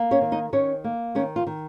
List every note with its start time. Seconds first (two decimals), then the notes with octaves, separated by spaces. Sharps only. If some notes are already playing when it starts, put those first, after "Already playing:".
Already playing: A#3
0.11 C#4 C#5
0.21 D#3
0.32 D#4 D#5
0.53 D#3 C#4 C#5
0.84 A#3
1.15 D#3 C#4 C#5
1.36 F4
1.47 D#3